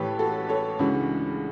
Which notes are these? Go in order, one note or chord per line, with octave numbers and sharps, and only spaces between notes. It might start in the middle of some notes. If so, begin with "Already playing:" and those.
Already playing: A1 A2 E3 G4 A4 B4 C#5
F#4 A4
A4 C#5
C#2 C#3 E3 D4 F#4